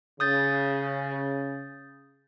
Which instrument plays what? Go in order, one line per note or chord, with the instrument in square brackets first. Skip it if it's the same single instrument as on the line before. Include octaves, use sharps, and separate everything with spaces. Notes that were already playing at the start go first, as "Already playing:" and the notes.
[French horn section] C#3 [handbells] D#6 G6 A6